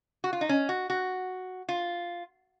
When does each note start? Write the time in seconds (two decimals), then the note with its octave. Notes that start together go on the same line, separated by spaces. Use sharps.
0.24 F#4
0.33 F4
0.41 D#4
0.49 C#4
0.69 F#4
0.90 F#4
1.69 F4